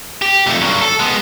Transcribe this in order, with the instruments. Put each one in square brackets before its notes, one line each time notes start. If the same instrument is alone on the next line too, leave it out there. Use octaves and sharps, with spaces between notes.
[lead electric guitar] G4
F2 A3
G2 F#3
A4
G#3 B3